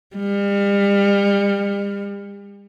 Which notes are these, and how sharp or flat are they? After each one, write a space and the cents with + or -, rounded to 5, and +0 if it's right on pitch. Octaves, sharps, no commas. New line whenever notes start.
G3 +40